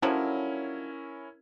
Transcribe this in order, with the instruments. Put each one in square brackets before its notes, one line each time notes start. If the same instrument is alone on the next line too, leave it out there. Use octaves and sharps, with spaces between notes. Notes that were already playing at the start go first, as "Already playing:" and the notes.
[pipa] D3 F3 F#3 [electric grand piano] C#4 E4 A#4